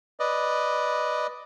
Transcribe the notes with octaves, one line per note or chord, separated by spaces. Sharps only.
B4 D5 D#5